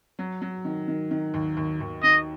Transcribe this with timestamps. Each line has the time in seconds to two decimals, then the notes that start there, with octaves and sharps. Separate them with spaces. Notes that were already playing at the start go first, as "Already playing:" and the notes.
0.19 F#3
0.42 F#3
0.65 D#3
0.88 D#3
1.11 D#3
1.34 D#2
1.57 D#2
1.81 D#2
2.03 D#3 D#5